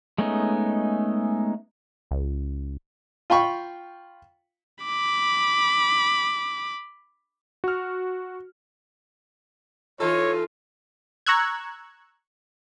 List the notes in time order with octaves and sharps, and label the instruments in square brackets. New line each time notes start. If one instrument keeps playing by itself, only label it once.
[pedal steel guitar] G#3 A3 B3 C#4 D#4
[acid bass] C#2
[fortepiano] F4 G5 B5 C#6
[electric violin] B5 D6
[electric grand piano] F#4 F6
[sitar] E3 D#4 A4 [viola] F4 [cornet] C#5
[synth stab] A#5 C#6 E6 F#6 G#6